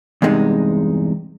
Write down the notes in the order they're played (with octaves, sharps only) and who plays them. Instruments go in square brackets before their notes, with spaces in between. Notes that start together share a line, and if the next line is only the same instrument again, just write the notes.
[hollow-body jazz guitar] E2 G2 C3 G#3 D#4